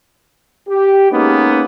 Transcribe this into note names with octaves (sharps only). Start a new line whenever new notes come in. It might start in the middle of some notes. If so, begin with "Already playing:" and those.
G4
G#3 A#3 B3 C#4 D#4